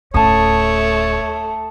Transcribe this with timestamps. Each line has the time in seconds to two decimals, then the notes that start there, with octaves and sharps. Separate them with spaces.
0.14 D1 A3 C#4 C#5 A5 D#6